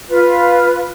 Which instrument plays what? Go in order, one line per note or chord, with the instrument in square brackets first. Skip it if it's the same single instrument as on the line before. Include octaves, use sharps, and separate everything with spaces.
[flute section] F4 B4